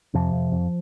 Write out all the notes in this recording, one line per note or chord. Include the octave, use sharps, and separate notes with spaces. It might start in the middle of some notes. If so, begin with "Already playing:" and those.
F2 C3 F3
F2
F2